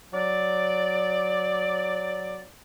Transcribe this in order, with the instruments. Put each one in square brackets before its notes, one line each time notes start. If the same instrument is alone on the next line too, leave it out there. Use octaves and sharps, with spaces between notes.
[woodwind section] F#3 D5